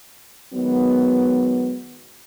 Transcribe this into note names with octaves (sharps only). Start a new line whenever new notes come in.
D#3 F#3 G#3 B3